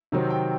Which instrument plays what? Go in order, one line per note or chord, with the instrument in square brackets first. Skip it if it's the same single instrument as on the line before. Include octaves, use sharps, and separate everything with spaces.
[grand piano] C3 D#3 F#3 C4
G5